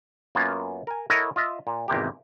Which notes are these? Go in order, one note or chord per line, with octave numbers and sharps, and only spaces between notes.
F#2 A#3 B3 C#4 F4
A#4 G#5
E4 A4 A#4 C#5 D#5 F#5
F4 D#5 E5
A#2
G#1 E2 C3 A#3 G4